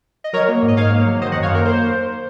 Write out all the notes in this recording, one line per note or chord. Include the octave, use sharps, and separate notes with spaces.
D#5
F#3 A#4 C#5
A#3
G#2
D#5
G#2 C#5 F5
A#3
F#3
D#3 C5 D#5
D#5 F#5
F#2
C#5 F5
A#3 A#4
C5